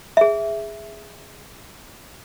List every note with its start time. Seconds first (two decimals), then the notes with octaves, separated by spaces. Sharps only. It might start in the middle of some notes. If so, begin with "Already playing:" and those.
0.17 G#4 E5